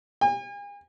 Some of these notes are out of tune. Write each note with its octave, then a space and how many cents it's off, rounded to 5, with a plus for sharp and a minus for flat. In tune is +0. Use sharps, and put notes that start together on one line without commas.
G#5 -40